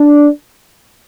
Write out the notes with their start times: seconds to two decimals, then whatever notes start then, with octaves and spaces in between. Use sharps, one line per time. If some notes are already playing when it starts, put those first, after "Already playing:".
Already playing: D4